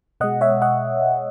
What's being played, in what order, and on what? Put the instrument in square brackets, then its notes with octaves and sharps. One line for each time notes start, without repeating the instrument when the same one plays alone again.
[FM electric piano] B2 G#3 D#5 F#5
C#5 E5
D#5 F#5